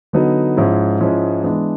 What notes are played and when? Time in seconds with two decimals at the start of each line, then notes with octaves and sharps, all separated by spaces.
0.13 D3 F#3 B3 D#4
0.57 G#2 F3 G#3 C#4 E4
1.00 G#2 F3 G#3 C#4 E4
1.44 E3 G#3 B3 D4